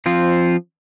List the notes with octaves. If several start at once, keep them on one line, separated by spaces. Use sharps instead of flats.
F3 C4 F4